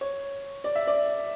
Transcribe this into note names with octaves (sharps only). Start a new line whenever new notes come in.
C#5
D5
E5
D5